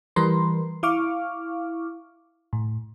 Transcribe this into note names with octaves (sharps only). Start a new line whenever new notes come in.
E3 G3 A#4 B4 C6
E4 F5 C#6 D6 F6
A2